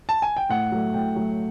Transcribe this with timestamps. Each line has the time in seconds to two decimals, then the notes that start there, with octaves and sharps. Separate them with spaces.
0.09 A5
0.22 G#5
0.37 G5
0.49 A2 F#5
0.72 F#3 A3
0.94 A2 G5
1.16 F#3 A3